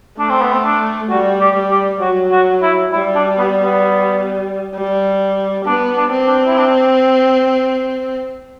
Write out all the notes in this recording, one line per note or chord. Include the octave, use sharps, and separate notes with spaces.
A3 D4
C4
B3
C4
D4
G3 F#4
G4
G3
G4
F#3 F#4
F#4
E4
G3 E4
D4
B3
B3
G3
B3 D4
D4
C4
D4
E4
D4